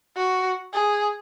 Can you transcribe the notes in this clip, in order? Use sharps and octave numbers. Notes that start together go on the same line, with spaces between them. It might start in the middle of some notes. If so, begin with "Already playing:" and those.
F#4
G#4